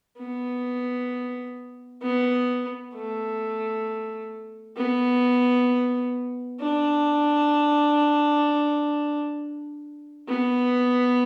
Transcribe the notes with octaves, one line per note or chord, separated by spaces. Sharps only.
B3
B3
A3
B3
D4
B3